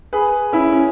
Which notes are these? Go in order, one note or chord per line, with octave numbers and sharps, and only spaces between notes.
G#4 B4
C#4 E4
C#4